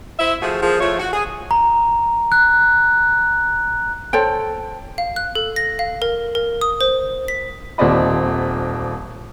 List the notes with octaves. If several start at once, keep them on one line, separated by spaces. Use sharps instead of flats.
E4 C5 E5
F3 A3 F#4 G#4
F3 A#3 G#4
F3 A3 E4 F4 C#5
F#4
G#4
A#5
F#6
A4 C5 C#5 G5
F5
F#6
A4
A#6
F5
A#4
A#4
D#6
C5
B6
D#1 D#2 C4 D5 D#5 B5